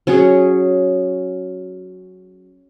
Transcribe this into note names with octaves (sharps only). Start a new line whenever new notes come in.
F#3 C#4 F#4 G#4